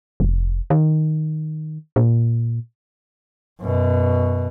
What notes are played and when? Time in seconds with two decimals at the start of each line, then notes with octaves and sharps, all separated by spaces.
0.20 F1
0.70 D#3
1.96 A#2
3.60 F#2 B2